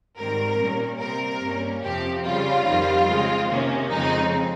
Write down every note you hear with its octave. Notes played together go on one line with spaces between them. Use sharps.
G#2 D#3 G3 C4 A#4
A#2 G3 A#3 C#4
C3 G3 C4 A#4
G2 G3 A#3 C#4
F2 C3 F3 C4 G4
C#3 G3 C#4 F4
F2 D#3 G3 C4
C#3 G#3 C4
C3 D#3 A#3 C#4
F2 C#3 G#3 C4 D#4